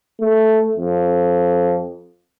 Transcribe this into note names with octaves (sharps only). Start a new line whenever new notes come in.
A3
F2